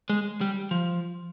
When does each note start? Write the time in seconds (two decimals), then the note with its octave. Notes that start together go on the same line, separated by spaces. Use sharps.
0.10 G#3
0.41 G3
0.71 F3